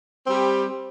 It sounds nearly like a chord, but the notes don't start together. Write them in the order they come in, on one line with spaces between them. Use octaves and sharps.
C4 G3 G4